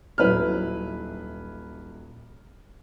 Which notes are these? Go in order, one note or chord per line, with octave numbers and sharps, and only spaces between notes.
D#1 F#3 E4 B4 B5 F6